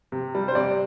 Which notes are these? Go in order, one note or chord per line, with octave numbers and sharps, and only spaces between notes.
C3
G3
C5
C3 D5